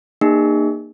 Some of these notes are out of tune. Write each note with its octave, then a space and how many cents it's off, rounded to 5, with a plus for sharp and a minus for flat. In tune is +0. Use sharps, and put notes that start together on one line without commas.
A#3 +0 D#4 -40 G#4 -40